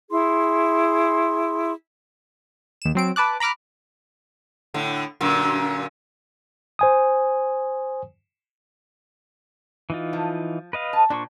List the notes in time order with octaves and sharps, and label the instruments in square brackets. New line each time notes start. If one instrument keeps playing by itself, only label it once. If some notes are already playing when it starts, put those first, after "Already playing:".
[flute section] E4 G#4 C6
[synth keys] D#2 E7
F#3 C4 D7
B4 A5 D6 F#6
A#5 B5 D6 F6 F#6
[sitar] A2 D3
F#2 A#2 D3
[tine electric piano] C5 G#5 D#6
[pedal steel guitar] E3 D#4 F4
[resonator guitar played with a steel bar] F3
[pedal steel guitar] B4 D#5 F5
[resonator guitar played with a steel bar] A5
[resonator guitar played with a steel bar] A#2 [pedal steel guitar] D4 C5 C#6